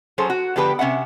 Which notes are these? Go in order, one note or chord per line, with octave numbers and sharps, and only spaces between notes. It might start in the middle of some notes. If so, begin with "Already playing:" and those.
F#3 C#4 G#4 A4 C5
F#4
D3 F3 B3 G4 B4 G5
C3 C#4 E5 F#5